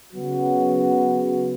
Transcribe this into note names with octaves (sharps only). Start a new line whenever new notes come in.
C#3 F#3 B3 F#4